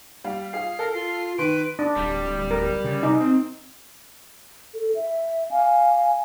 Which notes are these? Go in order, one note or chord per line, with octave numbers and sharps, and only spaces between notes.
G3 F5
F4 G#4 F5 C7
A4 A#4
F4 C7
D#3 B4 C6 D7
D4
D1 G3
A#4
C#3
C3 D#4
C4
A4
E5
F5 G#5